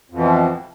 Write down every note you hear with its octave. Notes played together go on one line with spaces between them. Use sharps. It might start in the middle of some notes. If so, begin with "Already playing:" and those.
F2 B2 E3 F3